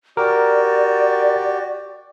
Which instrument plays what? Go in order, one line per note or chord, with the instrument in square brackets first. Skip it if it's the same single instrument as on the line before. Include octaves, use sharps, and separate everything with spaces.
[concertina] F#4 G4 [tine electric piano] A#4 [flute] D5